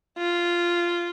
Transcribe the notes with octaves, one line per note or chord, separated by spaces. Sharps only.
F4